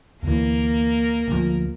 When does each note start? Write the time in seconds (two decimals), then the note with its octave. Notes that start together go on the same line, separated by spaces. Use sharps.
0.23 D2 E3 A#3 A#4
1.28 D2 F3